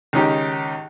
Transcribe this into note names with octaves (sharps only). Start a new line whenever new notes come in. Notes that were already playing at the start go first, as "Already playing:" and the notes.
C#2 D#3 C#4 D#4 G4